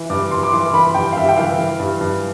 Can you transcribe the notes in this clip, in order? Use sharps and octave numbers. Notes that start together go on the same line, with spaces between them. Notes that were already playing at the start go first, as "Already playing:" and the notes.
Already playing: E3
G2 D6
G2 C6
D6
E3 C6
E3 B5
G2 G5
F5
G2 E5
G5
E3 F5
E3
G2
G2